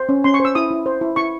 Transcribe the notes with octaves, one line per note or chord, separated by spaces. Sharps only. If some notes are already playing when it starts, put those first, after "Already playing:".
Already playing: C5
C#4
C#4 C6
C#6
C5
E6
E4 D#6
E4
C5
E4
E4 C#6